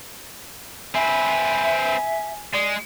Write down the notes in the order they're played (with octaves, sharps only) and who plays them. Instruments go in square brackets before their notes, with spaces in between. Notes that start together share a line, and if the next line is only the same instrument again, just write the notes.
[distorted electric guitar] C4 B4 [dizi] E5 [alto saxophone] G#5
[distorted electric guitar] G#3 [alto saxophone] D5